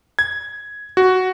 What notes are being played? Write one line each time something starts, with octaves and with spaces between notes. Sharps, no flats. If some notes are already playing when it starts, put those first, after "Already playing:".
G#6
F#4